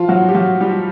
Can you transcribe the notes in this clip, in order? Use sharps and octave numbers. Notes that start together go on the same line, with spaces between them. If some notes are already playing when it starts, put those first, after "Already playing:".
Already playing: F3 F4
F#3 F#4
G4
F#3 F#4
G3 G4